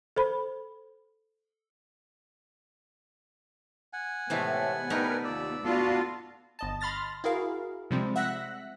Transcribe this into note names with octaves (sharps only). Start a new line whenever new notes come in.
A4 C5 B5
F#5 G#5
A2 C3 E3 G#3 A3 B3
G3 A3 D#4 A#4 B4
D#2 A#2 D5 E6
B3 D4 F4 F#4 A4 C6
G1 D#5 A5
B5 C6 F6 A6 A#6
E4 F#4 G#4 A#4 F5
C3 F3 G3 G#3 C4
E5 F#5 E6 F#6 A#6 B6